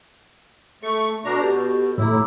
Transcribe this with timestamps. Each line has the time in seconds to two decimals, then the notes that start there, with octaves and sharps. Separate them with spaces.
0.83 A3 A4 C#6
1.25 B2 D4 A#5
1.42 B2 G4 A4
1.98 A2 E4 A#5 D6 E6